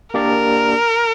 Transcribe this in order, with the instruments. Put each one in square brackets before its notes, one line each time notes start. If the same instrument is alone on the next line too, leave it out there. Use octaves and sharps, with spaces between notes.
[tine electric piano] A#3 D4 G4 D5 [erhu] A#4